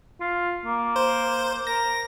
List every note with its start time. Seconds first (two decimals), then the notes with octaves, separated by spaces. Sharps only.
0.20 F4
0.65 A#3
0.96 C5
1.67 A#4 A#6